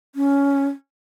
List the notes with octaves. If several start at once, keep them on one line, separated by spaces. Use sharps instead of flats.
C#4